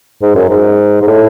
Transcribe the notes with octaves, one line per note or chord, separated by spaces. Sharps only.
G#2
F#2
G#2
G#2
A2